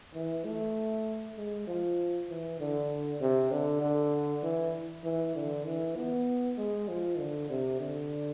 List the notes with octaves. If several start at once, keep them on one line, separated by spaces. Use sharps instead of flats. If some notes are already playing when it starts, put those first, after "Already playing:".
E3
A3
G#3
F3
E3
D3
C3
D3
D3
E3
E3
D3
E3
B3
G#3
F3
D3
C3
D3